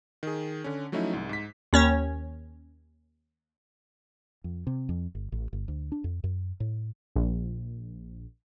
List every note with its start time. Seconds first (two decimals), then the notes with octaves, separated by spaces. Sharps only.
0.23 D#3 G#4
0.64 D3 C#4
0.92 F3 F#3 A3 C#4 D#4 E4
1.13 C2 G#2
1.29 G#2 B6
1.73 D#2 C#4 C#5
4.44 F2
4.67 C3
4.89 F2
5.15 G1
5.32 A1
5.53 G1
5.68 D2
5.92 D4
6.04 F2
6.24 F#2
6.60 A2
7.15 A#1